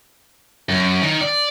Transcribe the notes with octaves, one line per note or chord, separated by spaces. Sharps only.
F#2
D#3
D5